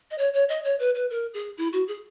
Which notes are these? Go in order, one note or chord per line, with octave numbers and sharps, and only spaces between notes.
D#5
C#5
C#5
D#5
C#5
B4
B4
A#4
G#4
E4
F#4
G#4